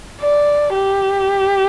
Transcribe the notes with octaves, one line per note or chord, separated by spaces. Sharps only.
D5
G4